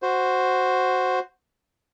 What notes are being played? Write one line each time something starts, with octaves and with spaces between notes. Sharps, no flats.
F#4 C5